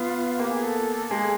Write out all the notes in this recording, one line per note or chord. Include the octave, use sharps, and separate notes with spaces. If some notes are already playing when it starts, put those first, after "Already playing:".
Already playing: B3 F4
A#3 G4
G#4
A4
G#3 G#4